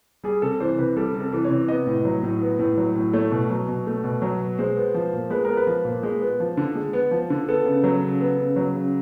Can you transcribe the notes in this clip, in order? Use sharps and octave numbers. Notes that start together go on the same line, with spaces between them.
G3 G#4
C3 A4
E3 C5
C3 B4
G3 A4
C3
A4
E3
C#5
C3
B3 D#5
A2
F#3
A2
B3
A2
F#3
A2
A3 C#5
B2
F#3
B2
A3
B2
F#3
B2
G#3 C5
B3
F3
A#2
G#3 B4
B3 A#4
B4
F3
A#2
G#3
B3
F3
D3
G#3
B3
F3
D3
B3 A4
C#3
F#3
C#3
B3
C#3
F#3
C#3